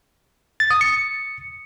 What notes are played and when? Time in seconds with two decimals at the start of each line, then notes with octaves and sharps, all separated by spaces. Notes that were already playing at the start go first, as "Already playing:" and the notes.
0.60 A6
0.71 D#6
0.81 C#7